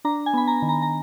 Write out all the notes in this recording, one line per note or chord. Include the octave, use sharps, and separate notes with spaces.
D4 A#5
G#5
B3 B5
A#5
D#3
A#5
A#5